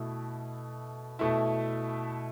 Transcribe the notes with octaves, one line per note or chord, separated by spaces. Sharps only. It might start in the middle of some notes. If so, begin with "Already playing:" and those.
Already playing: B2 A3 E4
B2 A3 E4